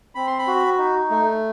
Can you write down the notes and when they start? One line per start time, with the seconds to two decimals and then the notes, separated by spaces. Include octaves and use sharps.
0.15 C4 B5
0.27 C6
0.39 B5
0.47 F#4
0.78 D#4
1.10 A3